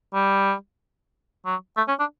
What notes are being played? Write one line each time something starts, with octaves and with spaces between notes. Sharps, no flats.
G3
F#3
A3
C#4
D4